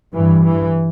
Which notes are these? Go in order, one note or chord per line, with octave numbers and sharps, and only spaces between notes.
G2 E3
E3